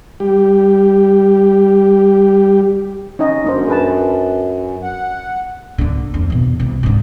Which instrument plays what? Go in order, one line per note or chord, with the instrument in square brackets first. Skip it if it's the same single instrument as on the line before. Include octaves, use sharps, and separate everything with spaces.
[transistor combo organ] G3 G4
[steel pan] C#4 D#4 D#5
[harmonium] F#2 [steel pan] A#3 D4 C5
[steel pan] G#4 B4 A5
[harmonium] F#5
[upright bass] D3 A#3
F2
E2 B2
C2
G#2 D3